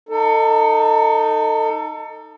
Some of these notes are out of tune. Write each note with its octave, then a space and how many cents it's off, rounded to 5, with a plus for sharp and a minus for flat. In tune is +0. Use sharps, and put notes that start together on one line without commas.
D#4 -5 A4 +25